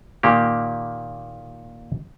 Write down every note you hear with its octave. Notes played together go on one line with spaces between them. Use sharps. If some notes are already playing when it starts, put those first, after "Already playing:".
A#2 D#3 A#3 G4